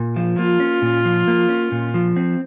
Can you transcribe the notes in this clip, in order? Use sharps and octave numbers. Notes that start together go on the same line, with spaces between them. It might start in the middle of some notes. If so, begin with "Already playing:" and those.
Already playing: A#2
F3
A#3 F4
C#4
A#2
F3
A#3
C#4
A#2
F3
C4